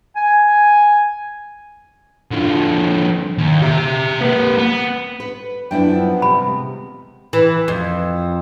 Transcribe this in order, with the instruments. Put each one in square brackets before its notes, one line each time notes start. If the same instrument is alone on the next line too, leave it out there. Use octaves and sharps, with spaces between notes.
[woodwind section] G#5
[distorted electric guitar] D3 F3
D#2
G4 E5
A#3 B4
B3
[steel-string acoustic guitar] B4
[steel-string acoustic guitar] F#2 D4 E4 [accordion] F3 B3 [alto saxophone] G5
[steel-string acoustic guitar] C3 [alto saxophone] G3 [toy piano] B5
[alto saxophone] G#3
[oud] E3
F2